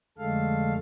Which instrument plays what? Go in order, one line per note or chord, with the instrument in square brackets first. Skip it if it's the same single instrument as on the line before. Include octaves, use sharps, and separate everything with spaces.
[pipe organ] F2 D3 G#3 A3 A4 F5